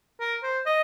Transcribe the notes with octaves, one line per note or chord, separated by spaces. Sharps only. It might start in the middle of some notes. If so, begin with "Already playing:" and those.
A#4
C5
D#5